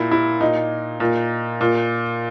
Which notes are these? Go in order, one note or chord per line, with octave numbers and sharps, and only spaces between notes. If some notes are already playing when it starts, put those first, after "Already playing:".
Already playing: A#2 E4
E4
A#2 D#4
A#2
A#2